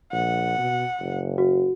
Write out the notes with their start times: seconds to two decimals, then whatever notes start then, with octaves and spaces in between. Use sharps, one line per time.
0.12 A#1 F#5
0.58 B2
1.00 F#1
1.38 F#4